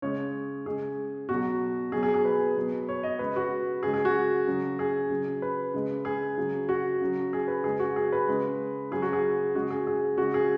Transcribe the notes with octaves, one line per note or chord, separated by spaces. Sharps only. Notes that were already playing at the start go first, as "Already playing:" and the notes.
C#3 G#3 C#5
C#3 G#3 G#4
B2 F#3 F#4
B2 F#3 G#4
G#4
G#4
B4
B2 F#3
C#5
D#5
C#3 G#3 B4
F#4
C#3 G#3 G#4
G#4
F#4
C#3 F#3
G#4
C#3 F#3
B4
C#3 G#3
G#4
C#3 F#3
F#4
C#3 F#3
G#4
B4
C#3 G#3 G#4
F#4
G#4
B4
C#3 G#3
C#3 F#3 G#4
F#4
G#4
C#3 G#3 F#4
G#4
G#4
C#3 G#3 F#4
G#4